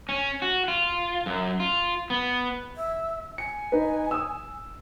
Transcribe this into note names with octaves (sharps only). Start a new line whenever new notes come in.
C#4
F#4
F4
F#2
F4
B3
E5
G#5 C#7
D#4 B4
D#6 E6